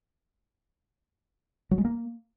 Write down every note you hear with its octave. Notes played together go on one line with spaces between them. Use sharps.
F#3
G#3
A#3